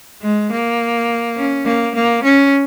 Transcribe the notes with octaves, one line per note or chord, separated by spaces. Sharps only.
G#3
A#3
C#4
A#3
A#3
C#4